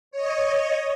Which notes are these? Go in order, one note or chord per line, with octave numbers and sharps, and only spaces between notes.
C#5 D#5